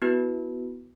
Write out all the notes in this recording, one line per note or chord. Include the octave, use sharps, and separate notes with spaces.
B3 E4 F#4 B4